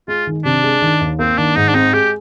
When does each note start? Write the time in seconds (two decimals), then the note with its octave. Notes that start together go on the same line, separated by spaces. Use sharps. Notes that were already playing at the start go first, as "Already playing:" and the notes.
0.08 G#3 F4
0.27 D#3
0.45 C3 D4
0.63 G#3
0.82 D#3
1.01 D#2
1.19 A#3 C4
1.37 D#3 D4
1.56 G#2 D#4
1.68 D4
1.74 C4 D#4
1.93 G#3 G4